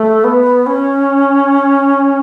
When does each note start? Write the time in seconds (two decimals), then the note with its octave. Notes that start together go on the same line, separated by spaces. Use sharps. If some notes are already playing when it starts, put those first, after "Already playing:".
Already playing: A3
0.24 B3
0.66 C#4